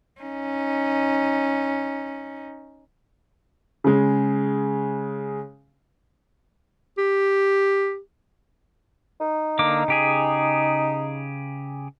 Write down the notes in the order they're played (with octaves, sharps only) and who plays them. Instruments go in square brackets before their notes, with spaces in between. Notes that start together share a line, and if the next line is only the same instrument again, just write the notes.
[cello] C#4 D#4
[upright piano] C#3 G#3
[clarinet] G4
[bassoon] D#4
[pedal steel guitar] D3 A#3 D6
C#3 G4 G#4